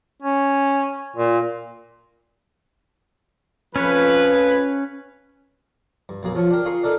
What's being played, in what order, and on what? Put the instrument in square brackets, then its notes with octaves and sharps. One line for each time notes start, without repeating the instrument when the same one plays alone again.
[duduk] C#4
A#2
[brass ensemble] F2 F3 B4 [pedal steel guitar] C#4 C#5
[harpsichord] G2
B1 F#2 A#3 G#4
F3 F4 C#5 A5 C#6
D4 G4 A#4
F4 G#4 A#5 C6 C#6
D4 D#4 A4 A#4 D5